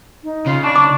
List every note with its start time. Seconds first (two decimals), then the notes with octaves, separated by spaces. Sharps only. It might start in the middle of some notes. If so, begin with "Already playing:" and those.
0.24 D#4
0.47 C#3 F4
0.63 D4 C#6
0.76 D6